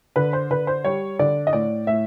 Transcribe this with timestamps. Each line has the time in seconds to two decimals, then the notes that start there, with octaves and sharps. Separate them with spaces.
0.16 D3 B4
0.33 C5
0.51 D3 B4
0.67 C5
0.84 G3 C#5
1.19 D3 D5
1.47 D#5
1.53 A2 D5
1.87 A2 E5